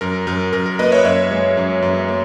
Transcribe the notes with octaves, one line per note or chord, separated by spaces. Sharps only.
F#2 A#4
F#2 A#4
F#2 A#4
A#4
A#3 B4 D#5
C#5 E5
F#2 C#5 E5
G#3
F#2
F#2
A#3